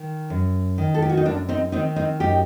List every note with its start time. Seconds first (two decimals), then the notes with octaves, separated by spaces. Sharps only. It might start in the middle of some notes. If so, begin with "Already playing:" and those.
Already playing: D#3
0.30 F#2
0.78 D#3
0.94 A4
1.02 G4
1.09 F#4
1.17 D#4
1.25 F#2 A#3 D4
1.49 C4 D#4
1.72 D#3 C4 D#4
1.96 C4 D#4
2.20 F#2 D#4 G4